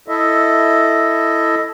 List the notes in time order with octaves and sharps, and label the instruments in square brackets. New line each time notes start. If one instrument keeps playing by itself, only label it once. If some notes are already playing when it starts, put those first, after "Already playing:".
[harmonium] E4 A4 D#5 E5